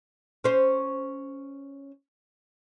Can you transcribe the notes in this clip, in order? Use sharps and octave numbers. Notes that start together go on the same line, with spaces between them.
C#4 C5